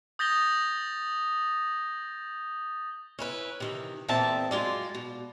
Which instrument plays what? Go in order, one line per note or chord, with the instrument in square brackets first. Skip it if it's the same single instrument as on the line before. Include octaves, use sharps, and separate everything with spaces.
[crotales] D#6 G6 A6 A#6 F7 G7
[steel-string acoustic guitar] C#4 E4 B4
C3 D#3 E3
E2 A#2 F3 C4 E5 A5
F#3 G#3 F4 D5
B2